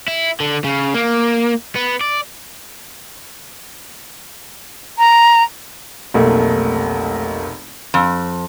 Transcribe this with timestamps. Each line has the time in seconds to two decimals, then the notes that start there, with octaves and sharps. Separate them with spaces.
0.08 E4
0.40 D3
0.64 C#3
0.94 A#3
1.76 B3
2.01 D5
4.99 A#5
6.14 F1 B1 A3 A#3
7.94 F2